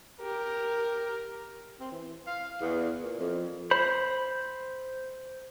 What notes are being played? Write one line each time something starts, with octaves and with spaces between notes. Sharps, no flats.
G4 A#4
C4
E3
F5
E2
A#2
F2
C5 B5